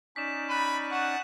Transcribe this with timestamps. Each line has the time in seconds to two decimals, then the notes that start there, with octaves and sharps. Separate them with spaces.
0.16 C#4 D#4 D5 B6 E7
0.50 B5 F#6 D#7
0.91 F#5 C#6 E7